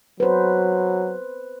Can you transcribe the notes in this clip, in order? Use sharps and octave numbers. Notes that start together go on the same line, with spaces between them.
F#3 B4 C5